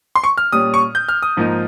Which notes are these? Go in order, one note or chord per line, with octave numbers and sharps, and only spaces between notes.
C6
C#6
F6
A#2 G3 C#4 D#6
C#6
G6
F6
D#6
G#2 F3 A#3 D#4